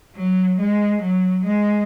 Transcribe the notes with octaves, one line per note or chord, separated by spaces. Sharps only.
F#3
G#3
F#3
G#3